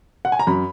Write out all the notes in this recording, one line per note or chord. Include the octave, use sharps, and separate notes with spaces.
F#5
G#5
A#5
F#2 B5